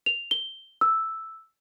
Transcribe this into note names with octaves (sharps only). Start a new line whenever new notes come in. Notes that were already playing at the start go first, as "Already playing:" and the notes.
F7
G7
E6